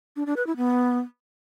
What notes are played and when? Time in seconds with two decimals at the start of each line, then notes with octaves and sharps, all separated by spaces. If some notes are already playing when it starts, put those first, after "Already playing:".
0.16 D4
0.26 D4
0.37 B4
0.47 E4
0.57 B3